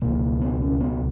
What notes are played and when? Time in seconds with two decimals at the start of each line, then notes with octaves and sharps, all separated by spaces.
0.02 C#2 B2 A#3
0.41 B3
0.61 C#4
0.80 B3